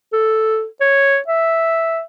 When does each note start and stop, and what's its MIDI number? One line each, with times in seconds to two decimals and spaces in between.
0.13 0.66 69
0.81 1.19 73
1.28 2.02 76